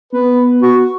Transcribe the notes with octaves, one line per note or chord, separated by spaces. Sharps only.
B3 B4
F#4